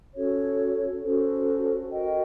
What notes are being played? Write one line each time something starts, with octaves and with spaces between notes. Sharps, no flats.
C#4 F#4 A4 C#5
C#4 F#4 A4 C5
F#4 A#4 D#5 G5